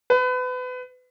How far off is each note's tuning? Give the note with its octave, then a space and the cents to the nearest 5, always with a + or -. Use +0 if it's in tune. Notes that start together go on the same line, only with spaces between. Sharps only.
B4 +30